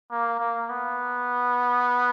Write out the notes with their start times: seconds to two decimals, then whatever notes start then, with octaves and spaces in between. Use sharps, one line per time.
0.11 A#3
0.40 A#3
0.70 B3